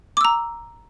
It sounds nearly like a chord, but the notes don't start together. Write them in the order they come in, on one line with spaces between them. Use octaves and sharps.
D6 E6 A#5